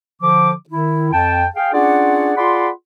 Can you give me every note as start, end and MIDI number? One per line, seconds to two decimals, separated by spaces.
0.22 0.52 50
0.22 0.52 53
0.22 0.52 86
0.69 1.11 51
0.69 1.11 64
1.13 1.46 41
1.13 1.46 79
1.13 1.46 81
1.56 1.73 68
1.56 1.73 77
1.56 1.73 79
1.73 2.32 61
1.73 2.32 62
1.73 2.32 65
1.73 2.32 68
1.73 2.32 74
1.73 2.32 78
2.37 2.69 65
2.37 2.69 68
2.37 2.69 74
2.37 2.69 78
2.37 2.69 83
2.37 2.69 84